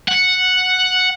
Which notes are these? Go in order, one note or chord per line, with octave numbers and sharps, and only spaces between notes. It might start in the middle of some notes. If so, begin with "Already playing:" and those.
F#5